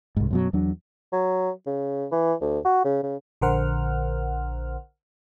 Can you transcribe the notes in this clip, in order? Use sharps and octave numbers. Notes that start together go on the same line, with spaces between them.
C2 G#2
F#2 B2 F#3
E2 F#3 D4
F#3
C#3
E3
D2
F#4
C#3
C#3
A#1 D3 A#4 C5 F#5 F6